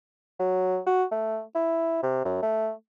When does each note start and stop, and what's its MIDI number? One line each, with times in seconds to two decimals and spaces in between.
0.40 0.79 54
0.86 1.04 66
1.12 1.42 57
1.55 2.00 64
2.03 2.20 48
2.25 2.41 42
2.42 2.71 57